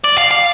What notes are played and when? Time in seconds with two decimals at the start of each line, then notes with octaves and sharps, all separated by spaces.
0.04 D5
0.18 F5
0.31 F5